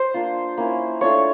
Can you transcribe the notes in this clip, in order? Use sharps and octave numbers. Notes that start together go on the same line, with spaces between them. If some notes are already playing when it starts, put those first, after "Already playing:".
Already playing: C5
A#3 D4 F4
A#3 C#4 E4
A3 D4 F4 C#5